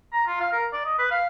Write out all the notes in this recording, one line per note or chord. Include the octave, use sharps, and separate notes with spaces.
A#5
F4
F5
A#4
D5
D#5
B4
F5